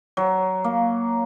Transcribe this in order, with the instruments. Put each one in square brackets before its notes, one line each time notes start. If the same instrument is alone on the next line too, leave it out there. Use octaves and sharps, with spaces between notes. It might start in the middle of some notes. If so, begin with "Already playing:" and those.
[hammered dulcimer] F#3
A#3